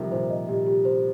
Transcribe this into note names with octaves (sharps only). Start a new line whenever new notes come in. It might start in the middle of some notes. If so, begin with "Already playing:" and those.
Already playing: C3 D#3 F3 G3
A#2 D#3 C5
D#5
A#2 G4
G4
C5